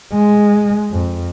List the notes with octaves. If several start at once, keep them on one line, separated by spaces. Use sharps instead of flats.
G#3
F2